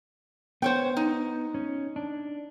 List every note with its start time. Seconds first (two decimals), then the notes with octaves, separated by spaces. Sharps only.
0.62 B3 C5 C#5 G5
0.97 D#4
1.54 C#4
1.96 D4